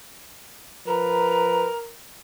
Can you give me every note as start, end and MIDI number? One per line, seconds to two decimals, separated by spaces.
0.87 1.70 53
0.87 1.92 70
0.87 1.70 71
0.87 1.78 82